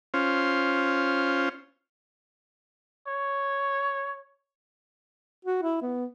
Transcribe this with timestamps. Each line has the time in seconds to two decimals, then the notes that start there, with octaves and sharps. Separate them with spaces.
0.14 C#4 F4 C5
3.07 C#5
5.45 F#4
5.63 E4
5.82 B3